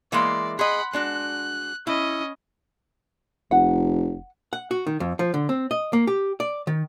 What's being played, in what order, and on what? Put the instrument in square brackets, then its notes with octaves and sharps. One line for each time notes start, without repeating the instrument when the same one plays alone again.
[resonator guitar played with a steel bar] E3 G#3 A#3 [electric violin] D5 [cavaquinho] E5 C6
[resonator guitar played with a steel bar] G#4 D#5 [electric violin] F#5 B5 [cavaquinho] C6
[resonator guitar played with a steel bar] G#3 D4 F#4 [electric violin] F#6
[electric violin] C#4 D#5 [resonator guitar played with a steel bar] E4
[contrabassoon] F1 [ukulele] F#5
[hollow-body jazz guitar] F#5
F#4
D#3
F2
F3
D3
C4
D#5
A#3
G4
D5
D#3